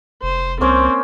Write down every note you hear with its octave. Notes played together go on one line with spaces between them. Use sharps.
F1 C5
C2 A#3 C4 C#4 C5